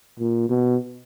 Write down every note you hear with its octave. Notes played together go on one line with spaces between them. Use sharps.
A#2
B2